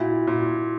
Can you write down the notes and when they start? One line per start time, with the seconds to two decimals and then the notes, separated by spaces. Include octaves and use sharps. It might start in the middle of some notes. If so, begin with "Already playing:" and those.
Already playing: A#2 E4 F#4
0.27 A#2